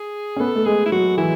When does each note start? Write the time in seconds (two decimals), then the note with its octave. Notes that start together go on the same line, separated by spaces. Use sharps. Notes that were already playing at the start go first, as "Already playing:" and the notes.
Already playing: G#4
0.36 C#4
0.40 B3 A4
0.55 A3
0.66 G#3 G#4
0.85 E4
0.92 F#3 F#4
1.18 E3 E4